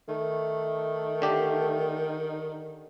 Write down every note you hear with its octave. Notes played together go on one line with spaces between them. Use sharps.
D#3 A3
D3 G4